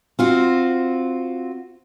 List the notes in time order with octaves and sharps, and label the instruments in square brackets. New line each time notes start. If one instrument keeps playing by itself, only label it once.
[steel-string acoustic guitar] C4 F4 F#4